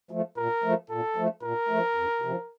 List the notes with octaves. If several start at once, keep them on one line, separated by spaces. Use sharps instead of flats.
F3 A3
A#2 A#4
F3 A3
A#2 A4
F3 A3
A#2 A#4
F3 A3
F2
C3 F3